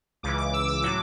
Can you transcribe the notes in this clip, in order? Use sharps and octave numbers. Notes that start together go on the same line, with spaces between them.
C#2 C#3 E3 D6
D6
E6
D6
A2 F#3 D6